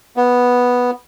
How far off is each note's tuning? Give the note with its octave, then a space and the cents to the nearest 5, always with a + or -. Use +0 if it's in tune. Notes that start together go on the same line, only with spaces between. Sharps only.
B3 -5